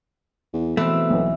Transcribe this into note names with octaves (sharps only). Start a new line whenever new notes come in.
E2
B2 E3 A3 C4
B1 B3